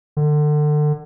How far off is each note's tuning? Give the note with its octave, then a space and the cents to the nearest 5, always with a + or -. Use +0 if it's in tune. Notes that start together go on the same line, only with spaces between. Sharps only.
D3 +30